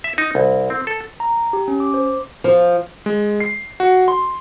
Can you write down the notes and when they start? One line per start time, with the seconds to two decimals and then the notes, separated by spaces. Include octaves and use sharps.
0.04 E5
0.18 D#4
0.35 C2
0.70 C4
0.87 A4
1.20 A#5
1.53 G4
1.68 C#4
1.80 D6
1.94 C5
2.44 F3
3.06 G#3
3.40 C7
3.80 F#4
4.08 C6